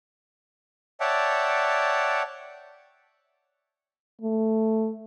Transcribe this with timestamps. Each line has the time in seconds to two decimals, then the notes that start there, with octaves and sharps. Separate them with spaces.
1.00 C#5 D5 E5 F#5 G5 A5
4.22 A3